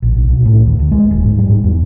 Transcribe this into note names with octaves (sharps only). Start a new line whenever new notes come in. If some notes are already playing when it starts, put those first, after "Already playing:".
A#1
B1
B1
A2
D#2
D2
G#3
D#1
G#2
G3
G#2
E2